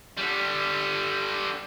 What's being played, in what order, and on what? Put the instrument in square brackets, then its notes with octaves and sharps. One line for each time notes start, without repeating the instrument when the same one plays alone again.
[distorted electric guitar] D3 G3